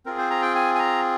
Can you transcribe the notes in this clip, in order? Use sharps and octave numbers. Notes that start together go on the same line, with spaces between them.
C4 F4 G#4 A#4
C5
A#5
G5
G#5
G#5
A#5